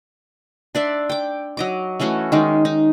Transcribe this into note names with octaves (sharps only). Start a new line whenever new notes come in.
D4 D5 E5 C6
G5 D6
F#3 D#5 D6
E3 A3 C#4 F#4
D#3 G#3 D#4
D#4